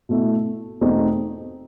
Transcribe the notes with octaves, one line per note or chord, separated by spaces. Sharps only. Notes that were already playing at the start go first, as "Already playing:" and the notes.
B2 A3 E4
E2 B2 A3 C4 D#4